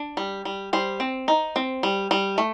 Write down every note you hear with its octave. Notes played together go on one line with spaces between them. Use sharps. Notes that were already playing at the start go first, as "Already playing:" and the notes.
Already playing: D4
G3
G3
G3 C5
C4
D#4
C4
G3
G3
A3